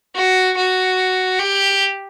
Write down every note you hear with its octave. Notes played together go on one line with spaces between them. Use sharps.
F#4
F#4
G4